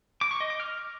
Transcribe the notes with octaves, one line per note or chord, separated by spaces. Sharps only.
D6
C#6
D#5
D6
F6